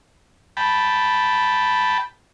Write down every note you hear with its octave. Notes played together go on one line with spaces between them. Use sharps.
G5 A5 B5